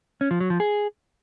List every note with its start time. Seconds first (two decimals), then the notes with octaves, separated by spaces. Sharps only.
0.21 C#4
0.31 F3
0.40 F#3
0.50 F3
0.60 G#4